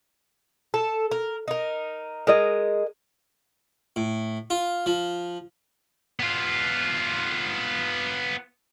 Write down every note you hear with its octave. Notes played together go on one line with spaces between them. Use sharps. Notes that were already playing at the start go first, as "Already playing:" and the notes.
A4
A#4
D#4 A#4
G#3 A#4 D#5
A2
F4
F3
B3 F4